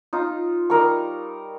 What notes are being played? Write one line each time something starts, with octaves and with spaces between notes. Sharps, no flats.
D#4 F4
G3 D#4 A#4 C#6